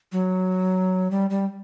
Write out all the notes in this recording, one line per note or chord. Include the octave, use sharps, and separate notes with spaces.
F#3
G3
G3